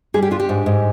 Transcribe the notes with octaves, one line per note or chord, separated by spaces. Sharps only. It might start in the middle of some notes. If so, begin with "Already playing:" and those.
G3 G#4
G4
D4 F4
G4
G#2
G#2